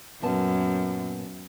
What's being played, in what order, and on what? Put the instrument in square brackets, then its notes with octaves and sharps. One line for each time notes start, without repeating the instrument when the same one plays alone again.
[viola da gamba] F#2 [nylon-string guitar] A#2 B3 A5